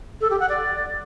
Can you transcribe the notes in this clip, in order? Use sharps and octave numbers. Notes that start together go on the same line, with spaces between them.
A4
G4
F#5
D5